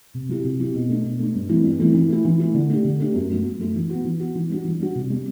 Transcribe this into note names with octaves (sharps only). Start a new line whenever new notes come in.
C3
F#3 C4 E4 G4
C3
F#3 C4 E4 G4
B2
A3 D4
B2
A3 D4
G2
E3 A3 C4 E4
G2
E3 A3 C4 E4
E3
A3 E4
E3
A3 E4
D3
A3 D4 G4
D3
A3 D4 G4
F#2
F#3 A3
F#2
F#3 A3
E3
B3 F#4
E3
B3 F#4
E3
G3 D4 F#4
E3
G3 D4 F#4
C3
G3 C4